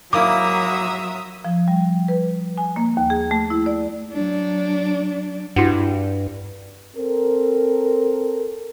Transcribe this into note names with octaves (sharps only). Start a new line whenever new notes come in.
G#2 F#3 A#3 E4 E5 A#5 D6 D#6
F3
G3
B4
G#5
A#3
D#2
G#4
A3
E4
D5
F#3 D4
G2 E4 F#4 F#5
C4 A4 A#4